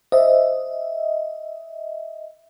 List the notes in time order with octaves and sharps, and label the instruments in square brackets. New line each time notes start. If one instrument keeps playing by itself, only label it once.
[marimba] C5 [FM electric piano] D#5 E5